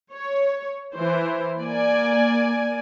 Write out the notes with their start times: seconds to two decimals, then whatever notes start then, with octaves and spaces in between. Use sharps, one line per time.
0.12 C#5
0.96 E3 C5
1.60 A#3 D5 G#5